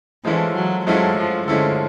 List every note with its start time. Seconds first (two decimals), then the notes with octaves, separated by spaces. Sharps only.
0.25 E3 F3 G#3 C#4 E4 A4
0.55 F#3
0.86 F3 F#3 G#3 C#4 E4 A4
1.18 F3
1.48 D3 F3 G#3 C#4 E4 A4